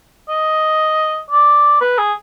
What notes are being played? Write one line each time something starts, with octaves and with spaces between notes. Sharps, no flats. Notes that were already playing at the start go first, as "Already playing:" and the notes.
D#5
D5
B4
G#4